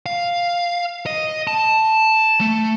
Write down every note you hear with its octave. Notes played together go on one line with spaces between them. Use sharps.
F5
D#5
A5
A3